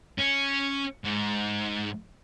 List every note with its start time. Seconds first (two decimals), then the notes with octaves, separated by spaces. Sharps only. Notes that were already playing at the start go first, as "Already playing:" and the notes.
0.19 C#4
1.04 G#2